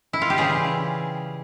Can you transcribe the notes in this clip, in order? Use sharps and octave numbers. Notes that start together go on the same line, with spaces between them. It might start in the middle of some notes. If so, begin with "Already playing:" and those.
E4
F4
G4
C#3 E3 G3 F4 G#4